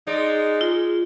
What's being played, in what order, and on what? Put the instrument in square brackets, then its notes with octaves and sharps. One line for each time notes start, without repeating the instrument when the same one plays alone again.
[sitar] G#3 D5 [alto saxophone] D#4
[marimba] F4